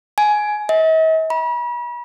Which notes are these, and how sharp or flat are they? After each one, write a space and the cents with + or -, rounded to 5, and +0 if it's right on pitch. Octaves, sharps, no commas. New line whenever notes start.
G#5 +15
D#5 +45
B5 -40